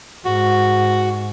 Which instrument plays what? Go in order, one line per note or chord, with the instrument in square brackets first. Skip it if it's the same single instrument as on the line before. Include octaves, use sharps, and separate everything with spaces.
[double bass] G#2 [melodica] F#4